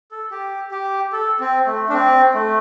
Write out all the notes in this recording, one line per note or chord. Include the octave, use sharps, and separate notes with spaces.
A4
G4
G4
A4
C4
A3
D4
C4
A3